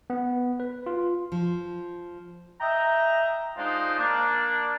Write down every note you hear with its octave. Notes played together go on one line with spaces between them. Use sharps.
B3
B4
F4
F3
D#5 E5 G5 A#5
G#3 D4 D#4 F4 C5
A#3 D4